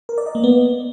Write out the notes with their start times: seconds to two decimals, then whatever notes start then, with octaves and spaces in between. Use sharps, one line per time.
0.09 A#4
0.18 D5
0.26 D#5
0.35 A#3
0.44 B3